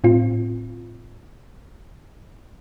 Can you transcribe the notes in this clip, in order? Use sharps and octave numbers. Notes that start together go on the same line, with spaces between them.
A2 C4 F4